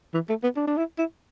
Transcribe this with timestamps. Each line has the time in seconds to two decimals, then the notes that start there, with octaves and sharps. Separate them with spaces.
0.14 E3
0.29 A3
0.43 B3
0.57 D4
0.67 D4
0.77 E4
0.98 E4